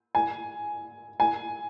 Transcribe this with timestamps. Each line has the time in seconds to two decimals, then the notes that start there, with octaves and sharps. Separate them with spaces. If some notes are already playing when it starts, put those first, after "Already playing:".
0.15 G#5
1.20 G#5